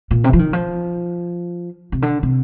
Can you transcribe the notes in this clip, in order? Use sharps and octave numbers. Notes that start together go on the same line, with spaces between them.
A#2
C3
F3
D#3
F3
C3
D3
C3